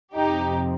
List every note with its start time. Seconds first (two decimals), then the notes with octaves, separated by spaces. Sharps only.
0.14 F2 C3 F3 D#4 G4